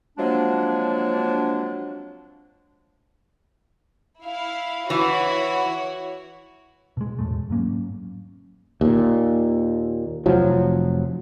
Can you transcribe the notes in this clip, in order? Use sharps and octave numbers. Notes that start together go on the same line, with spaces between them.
F3 F#3 G#3 A#3 C4 D4
E4 F5
E3 E4 F#4 C#5
B2 G#3
E1 A2 G#3 A3
G#2 F#3 A#3 C#4
D#2 A#2
F1 F3 F#3